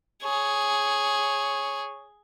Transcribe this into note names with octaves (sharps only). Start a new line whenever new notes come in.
G#4 C#5